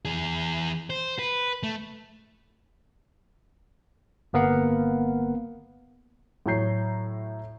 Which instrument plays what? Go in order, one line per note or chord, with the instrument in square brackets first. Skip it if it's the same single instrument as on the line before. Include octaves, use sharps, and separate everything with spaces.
[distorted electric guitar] E3 G#4
C5
B4
A3
[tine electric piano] G1 A#3 B3 A#4 F5 F#5
[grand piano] A2 F#3 C#5 A#5 G6 C7